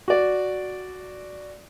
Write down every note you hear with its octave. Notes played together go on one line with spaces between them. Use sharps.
F#4 D5